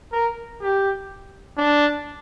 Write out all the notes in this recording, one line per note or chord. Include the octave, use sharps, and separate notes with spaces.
A#4
G4
D4